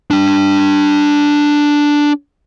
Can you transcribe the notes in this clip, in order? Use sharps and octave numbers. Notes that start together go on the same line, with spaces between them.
D4 G5